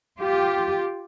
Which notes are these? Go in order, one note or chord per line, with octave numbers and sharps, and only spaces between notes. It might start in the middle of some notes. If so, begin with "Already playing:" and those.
F4 G4